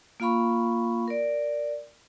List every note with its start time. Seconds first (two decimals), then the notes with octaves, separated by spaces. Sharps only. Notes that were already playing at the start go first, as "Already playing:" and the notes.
0.20 A#3 F4 F5 B5 C#6
1.08 A#4 D5